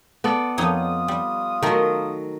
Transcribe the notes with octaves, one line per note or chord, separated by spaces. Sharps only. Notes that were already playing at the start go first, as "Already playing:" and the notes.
B3 A4 D5
F2 D#4 F4 C#5 D#6
G3
D#3 F#3 A3 A#4